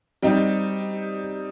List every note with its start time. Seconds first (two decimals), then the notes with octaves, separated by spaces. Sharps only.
0.23 G3 C4 D#4